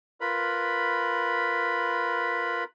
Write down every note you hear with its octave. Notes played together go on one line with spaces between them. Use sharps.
F4 A#4 B4 B5